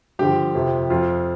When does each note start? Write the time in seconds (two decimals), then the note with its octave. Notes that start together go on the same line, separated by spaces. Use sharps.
0.19 G2 D3 F3 G4
0.55 F2 C3 F3
0.90 F2 F3 F4